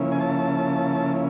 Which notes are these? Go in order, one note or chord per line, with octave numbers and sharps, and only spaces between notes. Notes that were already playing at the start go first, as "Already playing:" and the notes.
Already playing: C#3 F3 A#3 C#4 E4
G#5
A5